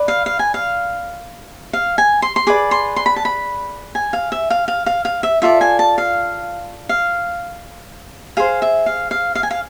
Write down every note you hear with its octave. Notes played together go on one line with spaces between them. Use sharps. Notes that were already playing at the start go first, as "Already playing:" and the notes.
Already playing: B4 D5
F5
F5
G#5
F5
F5
G#5
C6
C6
G#4 B4 D5 D6
C6
C6
B5
A5
B5
G#5
F5
E5
F5
F5
F5
F5
E5
F4 A4 D5 E5
G#5
A5
F5
F5
G#4 C5 F5
E5
F5
F5
F5
G#5
F5